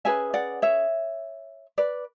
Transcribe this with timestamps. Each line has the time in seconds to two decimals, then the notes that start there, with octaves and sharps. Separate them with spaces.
0.05 C#4 G#4 B4 E5 G#5
0.34 D5 F#5
0.62 C#5 E5
1.78 B4 D5